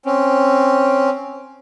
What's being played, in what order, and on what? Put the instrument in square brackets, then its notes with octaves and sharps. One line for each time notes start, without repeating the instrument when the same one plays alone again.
[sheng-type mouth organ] C4 C#4